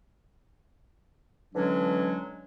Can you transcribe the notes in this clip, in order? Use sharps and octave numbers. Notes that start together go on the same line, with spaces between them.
D3 E3 F#3 G#3 C#4 D4